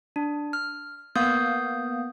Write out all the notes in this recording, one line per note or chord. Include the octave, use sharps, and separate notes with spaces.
D4
F6
A#3 B3 F5 D#6 G6